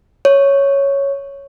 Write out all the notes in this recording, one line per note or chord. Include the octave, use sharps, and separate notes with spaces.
C#5